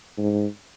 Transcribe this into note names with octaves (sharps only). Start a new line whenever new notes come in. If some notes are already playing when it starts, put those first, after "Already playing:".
G#2